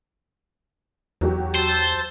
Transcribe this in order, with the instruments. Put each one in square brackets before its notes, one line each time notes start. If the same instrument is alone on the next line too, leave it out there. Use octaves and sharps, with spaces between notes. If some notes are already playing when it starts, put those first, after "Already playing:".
[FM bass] E2 [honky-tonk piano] F#3 F#4 G4
[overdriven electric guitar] C5 [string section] A5 E6 A6